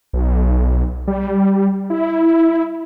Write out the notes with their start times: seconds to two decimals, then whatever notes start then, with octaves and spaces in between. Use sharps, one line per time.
0.13 B1
1.07 G3
1.90 E4